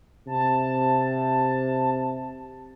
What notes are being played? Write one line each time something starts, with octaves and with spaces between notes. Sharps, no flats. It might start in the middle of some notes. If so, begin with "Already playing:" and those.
C3 A5